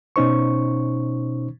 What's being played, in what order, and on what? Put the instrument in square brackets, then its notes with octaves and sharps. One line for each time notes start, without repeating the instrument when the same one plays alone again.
[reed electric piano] B2 C#4 D#4 C5 C#6